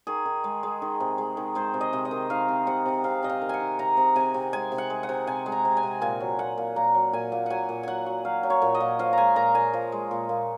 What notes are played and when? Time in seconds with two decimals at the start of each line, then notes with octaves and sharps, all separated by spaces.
0.07 D#3 G#4
0.25 D#3
0.44 G#3
0.63 G#3
0.82 D#3
1.00 C3
1.18 G#3
1.37 D#3
1.55 G#3 C5
1.74 C3
1.81 D#5
1.93 C3
2.05 D#5
2.11 D#3
2.30 D#3 F5
2.48 C3
2.67 C3 F#5
2.86 C3
3.04 C3 F5
3.23 C3 D#5
3.29 F5
3.42 D#3
3.49 F#5 G#5
3.60 D#3
3.79 C3 A#5
3.97 C3
4.15 C3 G#5
4.34 C3
4.53 G#3 G#5
4.72 C3
4.78 F#5
4.90 G#3
5.03 F#5
5.09 C3
5.27 C3 G#5
5.46 G#3
5.52 A#5
5.65 C3
5.77 G#5
5.83 C3
6.01 A#2 G#5
6.20 F#3
6.39 A#2 F#5
6.58 A#2
6.76 A#2 A#5
6.95 F#3
7.13 A#2 G#5
7.32 A#2
7.46 F#3 F#5 G#5
7.69 A#2
7.83 F#3 F#5 G#5
8.06 F#3
8.25 F#3 F5
8.43 F#3
8.50 C#5
8.62 A#2
8.75 D#5
8.80 A#2
8.99 F3 F5
9.13 G#3 G#5 A#5
9.36 A#2 A#5
9.55 A#2 G#5
9.73 F3
9.92 G#3
10.11 A#2
10.29 A#2